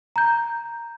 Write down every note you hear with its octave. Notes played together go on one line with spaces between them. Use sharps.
A#5 G6